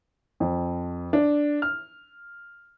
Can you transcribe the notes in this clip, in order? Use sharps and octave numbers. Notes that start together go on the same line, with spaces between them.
F2
D4
F6